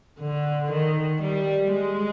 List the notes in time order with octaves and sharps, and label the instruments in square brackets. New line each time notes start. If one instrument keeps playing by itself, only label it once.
[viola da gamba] D3
D#3
G3
G#3